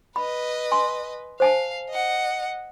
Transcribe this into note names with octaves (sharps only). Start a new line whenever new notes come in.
B4 D#5 B5
G#5 C6
C5 F5 G#5 A5
D#5 F#5